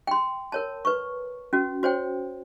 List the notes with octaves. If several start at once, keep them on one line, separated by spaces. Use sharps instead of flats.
G5 C6
A#4 C#5 A5
B4 C#6
C#4 F#4
F#4 C5 C#5 G5